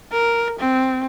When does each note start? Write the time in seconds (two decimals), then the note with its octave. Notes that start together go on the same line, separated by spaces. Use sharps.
0.12 A#4
0.60 C4